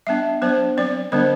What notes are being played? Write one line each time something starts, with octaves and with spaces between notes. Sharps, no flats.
G3 B3 D4 E5
F#3 B3 D4 C5
F#3 C4 D5
D3 G3 B3 D4 C5